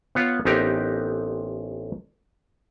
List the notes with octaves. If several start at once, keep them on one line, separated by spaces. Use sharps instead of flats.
B3 F4 C#5
A1 B3 C4 D#4 G4 A#4